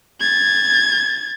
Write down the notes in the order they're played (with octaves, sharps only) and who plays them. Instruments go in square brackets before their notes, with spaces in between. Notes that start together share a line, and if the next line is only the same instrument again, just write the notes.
[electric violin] G#6 A6